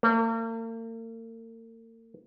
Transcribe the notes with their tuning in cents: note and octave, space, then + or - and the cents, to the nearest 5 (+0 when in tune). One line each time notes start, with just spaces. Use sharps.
A#3 -45